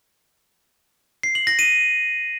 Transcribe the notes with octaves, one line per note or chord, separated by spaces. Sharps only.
C7
F#7
A#6
D#7